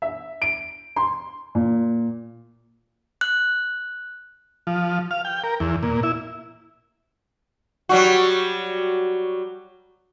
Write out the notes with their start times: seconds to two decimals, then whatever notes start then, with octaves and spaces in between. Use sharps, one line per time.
0.02 E5
0.42 D7
0.96 C6
1.55 A#2
3.21 F#6
4.67 F3
5.11 F5
5.25 G5
5.44 A#4
5.60 E2
5.83 A#2
6.03 E4
7.89 F#3 G3 F#4